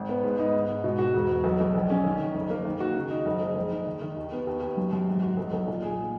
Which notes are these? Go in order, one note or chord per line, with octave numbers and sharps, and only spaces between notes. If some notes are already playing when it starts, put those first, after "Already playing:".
Already playing: G#1
B3
G#2
D#4
G#2
G#2
B2
F#4
E1
E1
B1
B1
A#1
C#4
D#3
D#3
F#1
A#3
D#3
F#4
C#3
D#4
F#1
G#3
A#1
D#4
D#3
D#3
D#2
B3
D#2
D#2
F#2
F#2
G#2
F#4
B1
B1
A#2
G#4